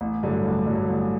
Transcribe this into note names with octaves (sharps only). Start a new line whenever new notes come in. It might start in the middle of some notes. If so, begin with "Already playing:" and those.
A1
G2 D3 F#3
A1
G2 D3 F#3
A1